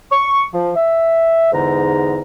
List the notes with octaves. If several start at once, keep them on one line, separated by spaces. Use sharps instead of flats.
C#6
F3
E5
E2 G#2 D3 D#4 A#5